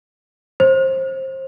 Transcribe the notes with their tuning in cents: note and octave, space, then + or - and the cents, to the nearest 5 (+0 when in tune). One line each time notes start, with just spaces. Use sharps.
C5 +25